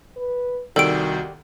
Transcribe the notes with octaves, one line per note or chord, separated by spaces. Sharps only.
B4
C2 D#3 F#4 G4 A4 D5 D7